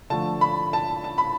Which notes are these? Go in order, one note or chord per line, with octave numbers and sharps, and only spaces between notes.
D3 F3 A3 A5
B5
A5
A5
B5